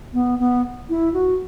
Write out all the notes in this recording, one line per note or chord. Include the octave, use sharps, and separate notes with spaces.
B3
B3
E4
F#4